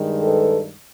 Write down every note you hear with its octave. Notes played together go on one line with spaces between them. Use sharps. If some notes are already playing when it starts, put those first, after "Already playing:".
Already playing: G2 D#3 G#3
A4 B4